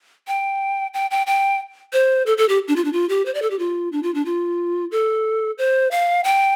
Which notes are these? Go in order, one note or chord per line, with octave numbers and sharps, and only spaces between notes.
G5
G5
G5
G5
C5
A4
A4
G4
D4
F4
D4
F4
G4
C5
D5
A4
G4
F4
D4
F4
D4
F4
A4
C5
F5
G5